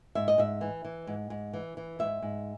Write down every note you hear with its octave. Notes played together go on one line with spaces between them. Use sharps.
G#2 E5
D#5
G#2 E5
E3
E3
G#2
G#2
E3
E3
G#2 E5
G#2